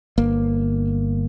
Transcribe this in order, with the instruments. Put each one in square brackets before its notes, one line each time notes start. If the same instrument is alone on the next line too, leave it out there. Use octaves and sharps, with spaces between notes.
[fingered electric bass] G1 A#3